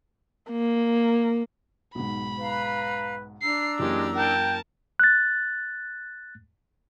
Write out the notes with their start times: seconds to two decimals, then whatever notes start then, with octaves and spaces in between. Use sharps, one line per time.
0.51 A#3
1.95 B1 G#2 B5
2.39 B4 F5 A#5
3.42 D4 A#5 E6 C7
3.79 F#2 E3 G#3 A#3 G4
4.15 A#4 G5 A5
5.00 F#6 A6